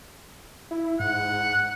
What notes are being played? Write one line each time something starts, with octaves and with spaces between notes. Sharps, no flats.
E4
G#2 F#5